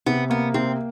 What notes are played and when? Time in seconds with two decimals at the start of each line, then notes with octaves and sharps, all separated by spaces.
0.06 C3 B3
0.30 A#3 B3
0.54 C3 C4